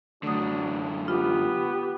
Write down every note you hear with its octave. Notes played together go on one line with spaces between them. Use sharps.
F#2 D3 A3 D4 F#4 D#6
B3 F4 G4